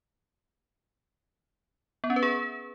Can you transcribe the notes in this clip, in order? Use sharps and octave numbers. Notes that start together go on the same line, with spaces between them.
B3
C#4
B4
G#4